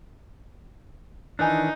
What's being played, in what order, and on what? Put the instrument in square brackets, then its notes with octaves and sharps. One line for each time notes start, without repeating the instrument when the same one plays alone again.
[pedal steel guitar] D#3 E3 D4 [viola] D#4 [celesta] G#5 F#6